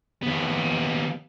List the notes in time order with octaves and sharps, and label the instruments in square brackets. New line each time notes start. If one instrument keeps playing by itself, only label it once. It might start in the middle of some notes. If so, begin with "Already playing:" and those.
[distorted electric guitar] D#2 B3